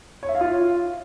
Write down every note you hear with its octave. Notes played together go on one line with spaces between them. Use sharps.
C#5
E5
F5
F4